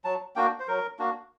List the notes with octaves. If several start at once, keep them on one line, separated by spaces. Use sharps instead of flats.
F#3 A5
A#3 D4 F#4 G5
C5
F#3 A#4
A#3 D4 F#4